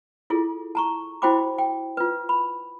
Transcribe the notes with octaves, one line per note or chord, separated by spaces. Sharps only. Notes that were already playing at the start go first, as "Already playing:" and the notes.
E4 F4 G#4 A4
A5 A#5 C#6
E4 F#4 C5 G5 B5 D6
G5
F4 B4
B5